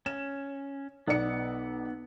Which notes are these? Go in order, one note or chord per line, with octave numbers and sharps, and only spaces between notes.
C#4 E7
B1 B3 D5 C#7